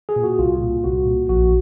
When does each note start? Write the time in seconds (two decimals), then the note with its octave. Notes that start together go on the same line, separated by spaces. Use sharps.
0.09 G#4
0.16 A#2
0.23 F#4
0.39 C2 F4
0.61 A#2
0.84 C2 F#4
1.06 A#2
1.29 A#1 F#4